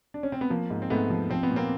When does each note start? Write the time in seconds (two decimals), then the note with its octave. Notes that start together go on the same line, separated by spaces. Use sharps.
0.14 D4
0.23 C#4
0.32 C4
0.41 B3
0.50 F3 A#3
0.70 G#2
0.82 C4
0.90 G#2 A3 B3
1.10 F3
1.30 F3 C4
1.43 B3
1.51 A#2
1.56 A#3 C4